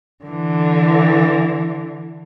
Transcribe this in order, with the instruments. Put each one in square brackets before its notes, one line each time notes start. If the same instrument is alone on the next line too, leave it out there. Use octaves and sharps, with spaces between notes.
[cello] D3 E3